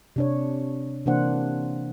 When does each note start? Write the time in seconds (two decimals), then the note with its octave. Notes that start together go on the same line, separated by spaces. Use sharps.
0.16 C3 D4 C#5
1.06 C3 E3 A#3 D4 C5 F#5